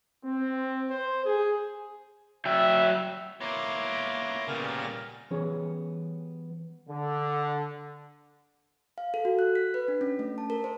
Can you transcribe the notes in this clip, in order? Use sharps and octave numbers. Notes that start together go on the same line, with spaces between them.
C4
C5
G#4
F#3 E5 G5
A#3 B3 E4 C#5 A#5 C6 D6
A#2 C#3 G3 B3 C#4 A#4 A#6
E3 G3 B3 C#4 G#4 C#5
D3
F5
A4
F#4
F#6
B6
B4
D4
C#4
A3
A5
A#4
C5